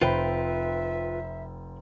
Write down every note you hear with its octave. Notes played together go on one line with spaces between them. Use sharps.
F1 C4 F4 B4 E5 G5 B5